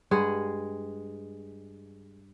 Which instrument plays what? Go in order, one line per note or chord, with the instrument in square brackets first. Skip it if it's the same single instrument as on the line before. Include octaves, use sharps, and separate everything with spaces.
[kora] G2 G#3 G#4 F#5